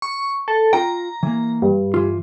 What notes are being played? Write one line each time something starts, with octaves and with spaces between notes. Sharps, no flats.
C#6
A4
F4 G5 A#5
E3 A#3
G2
E3 F4